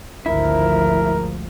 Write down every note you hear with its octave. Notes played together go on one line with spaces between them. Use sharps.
G#1 D2 F3 E4 A#4